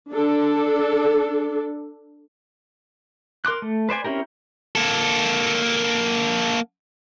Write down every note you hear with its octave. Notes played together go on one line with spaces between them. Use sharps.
D4 A4
A#4 C6 D6 F#6
A3
B4 C5 D5 G#5
C4 C#4 E4 G4 A#4
A#3 A4